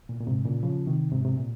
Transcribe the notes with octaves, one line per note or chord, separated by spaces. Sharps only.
A#2
A#2
G#2 C3
A#2 C#3
C#3 F3
C3 D#3
G#2 C3
C3
A#2